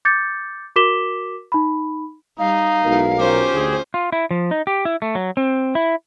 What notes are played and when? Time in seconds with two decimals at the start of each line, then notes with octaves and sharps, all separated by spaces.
0.05 D6 G6 A6 C#7
0.76 F#4 A#4 D6 B6 E7 G7
1.52 D#4 B5
2.39 G3 D#4 F5
2.85 B1 G#3 E4 A#4
3.19 C#4 F4 G4 C5
3.53 D2 G#4
3.94 F4
4.12 E4
4.31 F3
4.51 D#4
4.67 G4
4.85 E4
5.02 A3
5.15 F#3
5.37 C4
5.75 E4